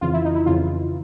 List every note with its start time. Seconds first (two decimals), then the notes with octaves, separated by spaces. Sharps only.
0.01 F2 C#3 E3 F4
0.13 E4
0.25 D#4
0.35 E4
0.46 F2 C#3 E3 F4